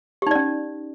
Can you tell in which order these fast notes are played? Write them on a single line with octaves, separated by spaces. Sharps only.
G4 D#4 D5 C#4